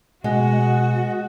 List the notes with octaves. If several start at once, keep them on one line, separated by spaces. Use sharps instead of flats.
B2 G#3 F#4 D#5 F#5